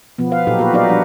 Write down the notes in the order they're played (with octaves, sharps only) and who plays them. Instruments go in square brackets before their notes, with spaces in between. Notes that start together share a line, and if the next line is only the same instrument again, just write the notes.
[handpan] B2 F3 B3
B4 F5
A#2 F#3 D#4 G4 A4
F#4 G4 B4
F#3 D#4 G4 B4 D5 F5
F3 G3 D4 F#5